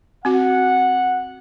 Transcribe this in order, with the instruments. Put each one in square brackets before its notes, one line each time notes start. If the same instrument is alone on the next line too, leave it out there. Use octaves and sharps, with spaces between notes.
[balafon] C4 F#4 [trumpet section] F#5